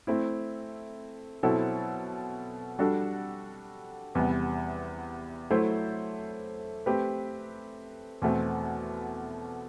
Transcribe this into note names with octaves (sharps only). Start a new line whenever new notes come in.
A3 C4 E4
B2 F#3 C4 E4 A4
G3 D4 F#4 A4
E2 C3 G3 B3
F#3 A3 E4 A4 C5
A3 C4 G4 B4
E2 B2 A3 C4